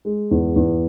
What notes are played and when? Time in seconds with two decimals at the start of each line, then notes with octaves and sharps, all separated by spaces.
0.05 G#3
0.31 E2
0.56 E2